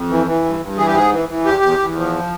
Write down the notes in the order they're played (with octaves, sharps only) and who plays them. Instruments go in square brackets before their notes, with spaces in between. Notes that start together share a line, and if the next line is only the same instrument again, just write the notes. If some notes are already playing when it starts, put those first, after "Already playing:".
Already playing: [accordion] F2
E3
E3
G2
G2
E3 G#4
G4
G#2 G#4
E3
E3
E2 G4
E2
E2
F3